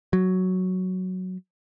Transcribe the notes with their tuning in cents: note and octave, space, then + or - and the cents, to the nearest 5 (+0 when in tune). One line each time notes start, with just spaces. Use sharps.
F#3 +0